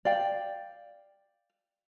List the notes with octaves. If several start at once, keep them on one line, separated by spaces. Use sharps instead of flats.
D5 F5 G5